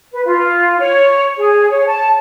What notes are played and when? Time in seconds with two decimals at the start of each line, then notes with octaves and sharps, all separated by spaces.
0.13 B4
0.26 F4
0.80 C#5
1.38 G#4
1.71 C#5
1.87 A5